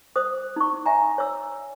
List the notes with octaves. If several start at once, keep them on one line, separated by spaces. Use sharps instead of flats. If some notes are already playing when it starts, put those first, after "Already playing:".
C5 D#6
D#4 C#6
E5 G#5 A#5
C#5 E6